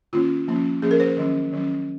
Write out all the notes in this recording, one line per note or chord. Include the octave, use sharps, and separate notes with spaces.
D#3 A#3 C#4 F4
F3 A#3 C#4
F3 A#3 C#4 G#4
A#4
C5
D#3 F#3 C#4
D#3 F#3 C#4